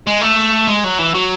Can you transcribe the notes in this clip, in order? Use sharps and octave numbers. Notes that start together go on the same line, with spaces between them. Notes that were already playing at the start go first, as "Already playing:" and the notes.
G#3
A3
G#3
F#3
E3
F#3